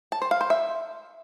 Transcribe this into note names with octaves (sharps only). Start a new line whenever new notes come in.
A5
C5
F5
C5
E5